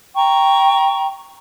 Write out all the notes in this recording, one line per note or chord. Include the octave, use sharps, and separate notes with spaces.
G5 A#5 C#6